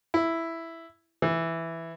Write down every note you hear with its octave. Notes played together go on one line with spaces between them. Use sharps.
E4
E3